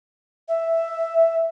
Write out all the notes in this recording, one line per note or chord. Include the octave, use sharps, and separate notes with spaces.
E5